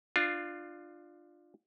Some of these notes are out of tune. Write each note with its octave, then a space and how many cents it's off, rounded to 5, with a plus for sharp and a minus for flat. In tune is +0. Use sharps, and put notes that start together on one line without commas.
D4 +25 F4 +0